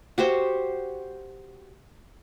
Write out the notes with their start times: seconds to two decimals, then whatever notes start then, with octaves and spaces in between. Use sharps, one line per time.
0.18 F#4 G4 C5